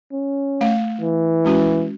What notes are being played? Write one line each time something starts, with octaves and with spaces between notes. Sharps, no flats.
C#4
A3 F5
E3
G#3 C#4 F#4